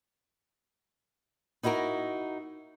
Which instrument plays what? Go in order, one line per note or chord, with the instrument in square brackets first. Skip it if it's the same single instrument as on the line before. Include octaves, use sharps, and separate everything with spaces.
[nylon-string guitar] D#4 E4 F#4 A4 A#4